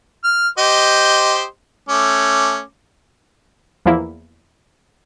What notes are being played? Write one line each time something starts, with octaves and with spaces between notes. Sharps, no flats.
F6
G4 C5 D#5
A3 C#4 D6
E2 F3 A#3 E4